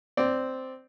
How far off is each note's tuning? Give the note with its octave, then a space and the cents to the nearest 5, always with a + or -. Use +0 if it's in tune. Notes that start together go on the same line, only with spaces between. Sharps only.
C4 -5 D5 +0